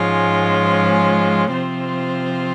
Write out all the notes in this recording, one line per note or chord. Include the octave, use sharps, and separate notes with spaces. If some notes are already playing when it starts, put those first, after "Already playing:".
Already playing: G#2 F3 G#3 C#4 F4
C3 F3 C4 F4 C5